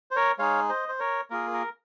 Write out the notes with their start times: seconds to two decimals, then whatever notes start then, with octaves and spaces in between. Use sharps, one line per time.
0.11 C5
0.16 A#4 C#5
0.39 G#3 D#4 G#4 C#5 F5
0.69 C5 D#5
0.88 C5
0.99 A#4 C#5
1.30 A#3 F4 G#4 A#4
1.53 A#4